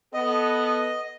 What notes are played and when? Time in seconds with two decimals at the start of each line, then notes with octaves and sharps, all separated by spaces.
0.14 B3 A4 D#5